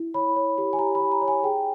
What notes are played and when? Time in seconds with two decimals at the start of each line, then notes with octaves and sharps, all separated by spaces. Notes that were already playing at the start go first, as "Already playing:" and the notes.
Already playing: E4
0.14 C#5 B5
0.36 C#5
0.58 G4
0.73 G#5
0.79 G4 A#5
0.95 B5
1.00 C#5
1.12 A#5
1.21 C#5
1.28 G#5
1.43 G#4 G5